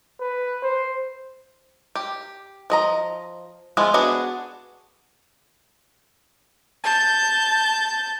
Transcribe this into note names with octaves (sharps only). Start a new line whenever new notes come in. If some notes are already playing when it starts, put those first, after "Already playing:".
B4
C5
G4
F3 D#5 A#5
F3 G#3 B3 E4 F4
B3 D4 F#4 G#4
A5 G6